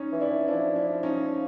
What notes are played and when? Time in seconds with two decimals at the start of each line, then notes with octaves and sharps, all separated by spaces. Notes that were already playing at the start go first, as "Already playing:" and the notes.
Already playing: C#4 D#4
0.12 E3
0.21 D4 E4
0.30 E3
0.48 F3 D4 E4
0.76 D4 E4
1.03 C#4 D#4